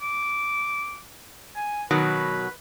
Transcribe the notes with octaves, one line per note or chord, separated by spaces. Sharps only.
D6
G#5
B2 D#3 F#3 B4